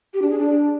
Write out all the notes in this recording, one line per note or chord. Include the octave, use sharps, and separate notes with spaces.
G4
D4
G#4
D4